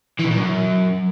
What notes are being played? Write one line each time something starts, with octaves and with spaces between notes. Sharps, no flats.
E3
B2
A#2
F#2